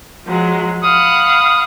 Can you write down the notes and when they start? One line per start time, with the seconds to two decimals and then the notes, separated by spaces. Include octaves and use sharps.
0.24 F3 F#3 G#3
0.83 F5 F#5 B5 D#6